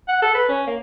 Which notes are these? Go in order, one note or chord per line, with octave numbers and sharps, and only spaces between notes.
F#5
A4
B4
C#4
A#3